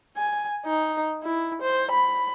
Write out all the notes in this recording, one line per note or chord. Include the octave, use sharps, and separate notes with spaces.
G#5
D#4
E4
C5
B5